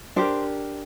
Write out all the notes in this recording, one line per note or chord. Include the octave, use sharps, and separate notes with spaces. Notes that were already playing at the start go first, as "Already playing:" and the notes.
D4 G4 A#4 C5